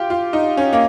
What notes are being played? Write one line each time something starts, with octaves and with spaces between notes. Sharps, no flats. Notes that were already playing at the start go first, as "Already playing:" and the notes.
Already playing: F4 G4
F4
D#4
C#4
A#3